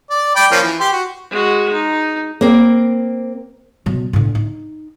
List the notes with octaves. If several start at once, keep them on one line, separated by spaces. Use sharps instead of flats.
D5
D5 G5 B5
F3 A#3 C#4
E3
G4 C6
F#4
G#3 F#4
D#4
A#3 C4
B2 F#3
A2 D3
D#4